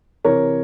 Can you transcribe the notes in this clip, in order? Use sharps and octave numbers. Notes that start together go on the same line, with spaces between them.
C3 E3 A#4 C#5